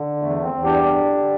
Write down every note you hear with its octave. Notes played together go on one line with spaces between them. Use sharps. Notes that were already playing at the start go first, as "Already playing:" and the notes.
Already playing: D3
E2 A3
C4
E2
D4 G4
D3
D3